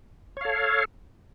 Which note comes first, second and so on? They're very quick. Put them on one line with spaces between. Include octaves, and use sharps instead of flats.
C#5 F5 A4